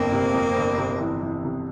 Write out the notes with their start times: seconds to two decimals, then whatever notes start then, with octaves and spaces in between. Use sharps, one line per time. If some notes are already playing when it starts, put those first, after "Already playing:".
Already playing: G1 F2 A#3 C4
0.12 C3
0.34 F2
0.56 G1
0.78 C3
1.00 E3
1.22 E3
1.45 C3